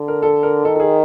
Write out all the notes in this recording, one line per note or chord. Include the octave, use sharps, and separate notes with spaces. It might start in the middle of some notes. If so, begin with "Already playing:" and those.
Already playing: D3
A#4
A4
A#4
D#3 A4
A4
G#4